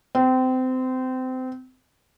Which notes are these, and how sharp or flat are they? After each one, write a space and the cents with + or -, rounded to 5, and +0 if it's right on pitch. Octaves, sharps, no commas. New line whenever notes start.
C4 -25